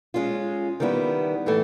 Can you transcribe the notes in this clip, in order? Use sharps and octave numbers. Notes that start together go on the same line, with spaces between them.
G#3 C#4 F4
D#3 G3 B3 E4
A2 E3 A3